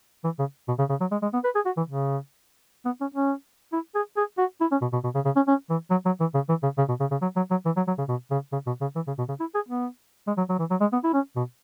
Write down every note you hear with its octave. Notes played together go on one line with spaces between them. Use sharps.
E3
C#3
B2
C#3
C#3
F#3
G#3
G#3
B3
B4
G#4
F#4
E3
C#3
B3
C#4
C#4
E4
G#4
G#4
F#4
E4
C#4
B2
B2
B2
C#3
C#3
C#4
C#4
E3
F#3
F#3
E3
C#3
E3
C#3
C#3
B2
C#3
C#3
F#3
F#3
F#3
E3
F#3
F#3
C#3
B2
C#3
C#3
B2
C#3
E3
C#3
B2
C#3
E4
G#4
B3
G#3
F#3
F#3
E3
F#3
G#3
B3
E4
C#4
B2